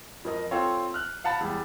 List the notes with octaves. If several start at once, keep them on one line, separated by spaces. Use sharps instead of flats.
F2 A#4 D#5
C4 F4 A4 C#5
F6 F#6
F5 F#5 A5 B5 A6
E2 G3